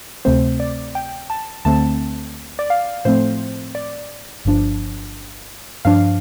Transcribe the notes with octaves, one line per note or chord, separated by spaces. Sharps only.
D2 C3 A3 C4 C5
D5
G5
A5
D2 D3 A3 C4 A5
D5
F5
A2 F3 A3 C4 C5
D5
G1 G2 F3 D4
G2 F3 D4 F5